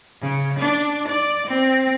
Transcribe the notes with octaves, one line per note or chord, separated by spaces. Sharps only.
C#3
D4
D5
C4